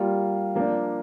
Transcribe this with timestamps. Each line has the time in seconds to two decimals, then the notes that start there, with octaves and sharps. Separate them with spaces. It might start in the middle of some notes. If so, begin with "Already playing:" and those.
Already playing: G3 A#3 F4
0.55 F3 A#3 D4